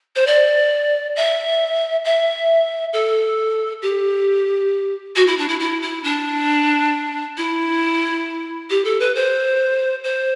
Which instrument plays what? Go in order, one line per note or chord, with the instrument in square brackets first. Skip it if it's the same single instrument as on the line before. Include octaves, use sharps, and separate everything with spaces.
[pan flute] C5
D5
E5
E5
A4
G4
F#4
E4
D4
E4
E4
E4
D4
E4
G4
A4
B4
C5
C5